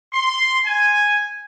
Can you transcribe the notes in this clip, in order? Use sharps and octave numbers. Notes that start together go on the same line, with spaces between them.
C6
G#5